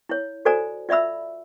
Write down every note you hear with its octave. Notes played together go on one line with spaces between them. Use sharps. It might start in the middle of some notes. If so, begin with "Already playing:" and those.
E4 C#5
F#4 A4 C5 D5 G#5 A#5
F4 D5 E5 B5 E6